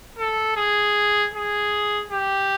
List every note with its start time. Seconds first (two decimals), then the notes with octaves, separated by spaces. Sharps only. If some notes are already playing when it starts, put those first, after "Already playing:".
0.18 A4
0.56 G#4
1.34 G#4
2.11 G4